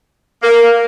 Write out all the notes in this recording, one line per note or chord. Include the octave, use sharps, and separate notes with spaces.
A#3